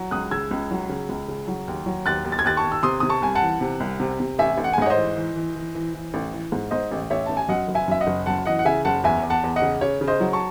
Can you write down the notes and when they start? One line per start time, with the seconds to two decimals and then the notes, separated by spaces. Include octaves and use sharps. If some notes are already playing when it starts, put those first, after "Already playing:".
Already playing: F#3
0.11 C#2 D#6 F#6
0.31 C#3 E6 G#6
0.51 C#2
0.71 F#3
0.89 C#3
1.09 C#2
1.28 C#3
1.48 F#3
1.68 D#2
1.86 F#3
2.06 D#2 F#6 A6
2.25 D#2
2.32 A6
2.39 G#6
2.44 D#2 F#6 A6
2.57 A5 C#6
2.64 D#2
2.72 E6
2.83 C3 C6 D#6
3.00 C3 D#6
3.09 A5 C#6
3.22 C2 G#5
3.35 F#5 A5
3.42 E3
3.61 C3
3.80 C2
4.00 C3
4.20 C3
4.39 A1 E5 G#5
4.57 A1
4.64 F#5
4.73 G#5
4.78 G#2 D#5 F#5
4.86 C#5
4.90 C5 D#5
4.97 E3
5.16 E3
5.36 E3
5.56 E3
5.75 E3
5.94 E3
6.14 A1
6.33 E3
6.52 G#2
6.71 G#2 C5 D#5
6.91 A1
7.10 A1 C#5 E5
7.26 A1 A5
7.37 G#5
7.48 F#2 D#5 F#5
7.68 F#1
7.75 E5 G#5
7.88 F#2 E5
8.01 D#5 F#5
8.07 F#1
8.26 F#2 F#5 A5
8.45 E3 D#5 F#5
8.59 F#5
8.65 C#3 E5 G#5
8.85 F#1 F#5 A5
9.04 E2 E5 G#5
9.23 E2
9.30 F#5 A5
9.44 E2
9.56 D#5 F#5
9.62 C#3
9.81 C#3 C#5
10.01 C#3
10.08 C5 D#5
10.20 F#3
10.33 A5 C#6